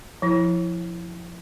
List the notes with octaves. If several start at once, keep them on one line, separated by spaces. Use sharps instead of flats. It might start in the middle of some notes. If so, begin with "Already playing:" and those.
F3 E4